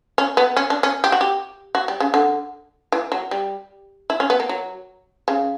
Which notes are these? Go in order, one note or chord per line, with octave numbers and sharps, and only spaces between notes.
C#4
B3
C#4
D4
C#4
G4
F#4
G4
F#4
G3
C#3
D3
E3
F#3
G3
E4
C#4
B3
A#3
F#3
C#3